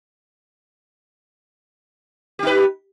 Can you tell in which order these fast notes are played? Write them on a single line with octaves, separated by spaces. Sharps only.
G4 D#4 B4